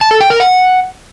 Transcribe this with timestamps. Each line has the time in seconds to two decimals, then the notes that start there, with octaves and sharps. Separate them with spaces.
0.01 A5
0.11 A4
0.21 G5
0.30 A#4
0.40 F#5